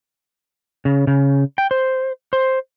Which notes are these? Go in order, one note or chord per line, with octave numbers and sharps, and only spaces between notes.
C#3
C#3
G5
C5
C5